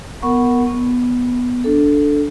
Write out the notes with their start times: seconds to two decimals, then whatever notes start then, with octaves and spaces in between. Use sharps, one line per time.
0.22 B3 A#4 F#5 C#6
0.67 B3
1.64 D4 A4